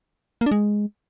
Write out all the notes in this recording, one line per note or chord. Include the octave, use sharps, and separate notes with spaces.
A#3
D4
G#3